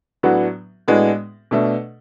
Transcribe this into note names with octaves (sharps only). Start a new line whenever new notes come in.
A2 F#3 B3 D4 F#4
A2 G#3 B3 D4 F#4
B2 A3 D4